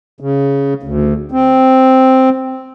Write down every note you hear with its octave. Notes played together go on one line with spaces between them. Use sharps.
C#3
D2
C4